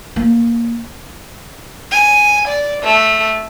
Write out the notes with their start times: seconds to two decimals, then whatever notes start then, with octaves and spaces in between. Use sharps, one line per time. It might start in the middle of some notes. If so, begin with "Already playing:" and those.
0.16 A#3
1.92 G#5
2.48 D5
2.83 A3